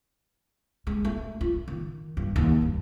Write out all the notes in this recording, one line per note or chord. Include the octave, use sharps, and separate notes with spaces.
G#3
A3
F4
D#3
G2
D#2
G2